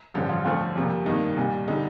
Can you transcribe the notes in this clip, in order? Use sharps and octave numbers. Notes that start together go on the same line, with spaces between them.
A1 G2 D3 F3 G4
F4
D2 D3 F3 A3 F4
F2 C3 G3 A#3
G2 D#3 A#3 D#4
C2 A#2 G3
D3 G3 D#4